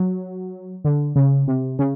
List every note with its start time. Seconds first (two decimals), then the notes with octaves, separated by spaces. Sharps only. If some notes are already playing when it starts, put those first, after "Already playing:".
Already playing: F#3
0.84 D3
1.16 C#3
1.48 C3
1.79 C#3